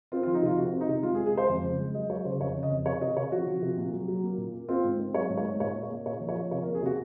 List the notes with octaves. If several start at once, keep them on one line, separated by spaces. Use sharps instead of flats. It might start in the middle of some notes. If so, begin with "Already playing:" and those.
C4 F4
F4
F3
D#4
C3 F4
C3 F#4
C4
D#4
C3
G#3 F4
G#4
G#3
G#4
G#3 C5
F2
C#3
G#3
F#3 D#5
F#3 C#5
C#3 C5
F2 C#5
C#3
D#5
F2
C3 C#5
C3 D#5
C3 C#5
F3 F#4
F3
C3
A#2
F#3
F#3
A#3
A#2
A#3
C4 F4
G#2
C4
F#3 C#5
G#2
C#5
G#2
A#2 C#5
A#2
C#5
A#3
A#2 C#5
F3
C#5
F3
C3 C#5
A#4
A#3
G#4
C3 F#4